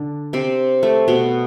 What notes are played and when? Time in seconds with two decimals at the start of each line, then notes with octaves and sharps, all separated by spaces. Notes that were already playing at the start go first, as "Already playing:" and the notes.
Already playing: D3 D4
0.33 C3 C4
0.83 A3
1.08 B2 B3